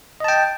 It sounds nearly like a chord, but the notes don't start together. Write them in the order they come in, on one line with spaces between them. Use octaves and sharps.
D#5 A5 G5